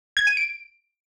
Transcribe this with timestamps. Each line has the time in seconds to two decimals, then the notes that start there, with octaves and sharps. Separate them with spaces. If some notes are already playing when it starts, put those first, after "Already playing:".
0.17 G#6
0.27 D#7
0.37 D7